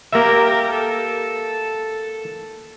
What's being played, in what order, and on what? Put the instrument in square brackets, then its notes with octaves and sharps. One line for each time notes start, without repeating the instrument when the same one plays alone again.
[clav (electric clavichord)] A#3 E5 [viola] G4 A#4
[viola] A4